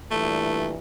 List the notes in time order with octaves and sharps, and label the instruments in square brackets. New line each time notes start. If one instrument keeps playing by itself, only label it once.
[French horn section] G2 A#2 E3 [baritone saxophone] A3